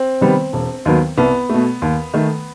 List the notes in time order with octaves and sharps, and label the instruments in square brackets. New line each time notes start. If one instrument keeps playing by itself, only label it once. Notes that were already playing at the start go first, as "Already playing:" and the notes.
Already playing: [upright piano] C4
C3 D#3 G3 B3
E1
D#2 D#3 F#3 B3
C2 B3
B2 A3
D#2
D#3 A3